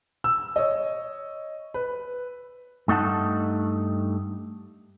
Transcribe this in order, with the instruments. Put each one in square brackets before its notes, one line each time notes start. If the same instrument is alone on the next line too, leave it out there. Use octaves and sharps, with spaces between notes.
[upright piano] E6
C#5 D#5
B4
[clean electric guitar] G2 A3 D#4 F#5 A5